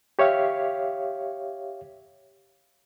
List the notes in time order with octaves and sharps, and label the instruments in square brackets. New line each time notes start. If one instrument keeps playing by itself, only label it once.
[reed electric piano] G4 C#5 E5 F5